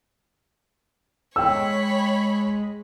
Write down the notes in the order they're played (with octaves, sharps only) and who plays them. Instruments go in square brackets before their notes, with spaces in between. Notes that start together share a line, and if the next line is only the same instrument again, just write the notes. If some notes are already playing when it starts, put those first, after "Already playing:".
[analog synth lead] G#3 [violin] C#5 B5 [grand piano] G5 E6